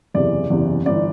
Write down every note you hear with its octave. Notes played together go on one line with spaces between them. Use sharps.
F#1 E2 C3 E3 D5
F#1 E2 C3 E3
G1 E3 D5